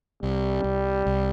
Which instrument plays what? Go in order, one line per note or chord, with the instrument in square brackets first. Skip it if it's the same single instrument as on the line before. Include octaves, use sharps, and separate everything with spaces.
[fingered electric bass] C2 [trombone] G3
[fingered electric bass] C2
C2